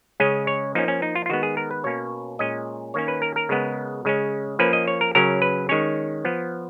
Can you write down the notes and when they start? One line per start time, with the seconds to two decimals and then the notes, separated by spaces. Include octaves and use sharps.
0.20 C#3 G#3 C#4 D#5
0.47 C#5
0.75 F3 A#3 C#4 D#4
0.88 C#4
1.02 D#4
1.15 F4
1.26 F4
1.30 D#3 G#3 B3 F#4
1.43 G#4
1.57 A#4
1.71 B4
1.84 B2 A#3 C#4 C#5
2.39 A#2 G#3 C#4 D#5
2.94 D#3 A#3 C#4 C#5
3.08 B4
3.22 A#4
3.36 A#4
3.49 C#3 G#3 B3
4.05 C#3 G#3 C#4
4.59 F3 A#3 C#4 B4
4.73 D#5
4.88 C#5
5.01 A#4
5.15 C#3 F#3 C#4 A#4
5.42 B4
5.69 D#3 G#3 C#4 C#5
6.25 F3 B3